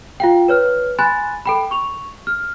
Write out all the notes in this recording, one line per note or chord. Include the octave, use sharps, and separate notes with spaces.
F4 F5 G5
B4 C#5 F6
G#5 B5 C6 F#6 A6
A4 G5 B5
C#6 F7
F6